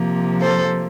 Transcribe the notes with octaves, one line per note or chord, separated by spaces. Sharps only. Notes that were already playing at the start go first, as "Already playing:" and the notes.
Already playing: C3 F3 A#3
A4 C5